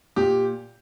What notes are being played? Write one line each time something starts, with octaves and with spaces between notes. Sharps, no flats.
A#2 G4